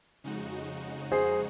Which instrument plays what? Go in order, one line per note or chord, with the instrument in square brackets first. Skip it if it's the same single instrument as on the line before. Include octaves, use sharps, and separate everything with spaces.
[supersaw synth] F2 C#3 G#3 D#4 F#4
[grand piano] G#4 C5